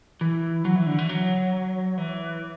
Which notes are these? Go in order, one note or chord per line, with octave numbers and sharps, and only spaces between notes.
E3
F#3
E3
D3
E3
F#3
E3